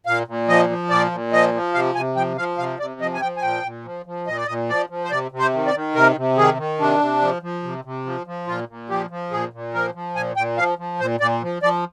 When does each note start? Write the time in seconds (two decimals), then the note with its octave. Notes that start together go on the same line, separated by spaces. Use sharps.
0.06 A#2 F5
0.27 A#2
0.48 F3 D#5
0.69 F3
0.90 A#2 D5
1.11 A#2
1.32 F3 D#5
1.54 F3
1.74 C3 F5
1.95 C3 G#5
2.16 F3 G5
2.37 F3 F5
2.58 C3 F5
2.80 C3 D5
3.01 F3 D#5
3.14 G#5
3.21 F3 G5
3.37 G#5
3.42 A#2 G5
3.64 A#2
3.85 F3
4.06 F3
4.27 A#2 D#5
4.37 D5
4.47 A#2 D#5
4.69 F3 D5
4.89 F3
5.04 C5
5.11 C3 D5
5.31 C3
5.39 C5
5.54 D#3
5.67 D5
5.75 D#3
5.95 C3 A#4
6.16 C3
6.37 D#3 G#4
6.58 D#3
6.79 C3 D4
7.00 C3
7.22 F3
7.42 F3
7.63 C3
7.85 C3
8.05 F3
8.27 F3
8.47 A#2 F4
8.69 A#2
8.90 F3 G4
9.10 F3
9.31 A#2 G#4
9.53 A#2
9.74 F3 A#4
9.95 F3
10.15 A#2 G#5
10.36 A#2 G5
10.58 F3 F5
10.78 F3
11.00 A#2 C5
11.20 A#2 D5
11.42 F3
11.62 F3 D5